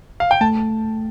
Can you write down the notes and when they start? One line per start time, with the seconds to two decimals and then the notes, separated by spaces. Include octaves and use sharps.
0.20 F5
0.31 G5
0.41 A3 A5